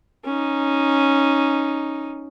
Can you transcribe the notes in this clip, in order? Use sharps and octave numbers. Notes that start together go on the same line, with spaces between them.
C#4 D#4